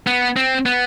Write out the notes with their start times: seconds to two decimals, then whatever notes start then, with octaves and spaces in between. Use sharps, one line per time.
0.07 B3
0.36 C4
0.66 B3